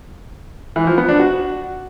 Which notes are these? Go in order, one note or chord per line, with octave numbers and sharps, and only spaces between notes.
E3
F3
B3
D4
F#4